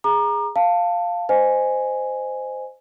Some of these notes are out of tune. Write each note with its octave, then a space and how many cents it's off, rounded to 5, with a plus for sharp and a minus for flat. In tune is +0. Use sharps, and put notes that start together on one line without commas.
G#4 +0 A#5 +10 D6 +40
F5 +0 A5 +10
C5 -10 D#5 -15 G#5 +0